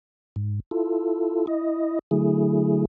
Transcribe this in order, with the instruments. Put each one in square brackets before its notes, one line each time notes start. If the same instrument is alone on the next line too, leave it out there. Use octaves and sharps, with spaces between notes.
[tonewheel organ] G#2
E4 F4 A4
E4 D#5
D3 F#3 A3 E4 G#4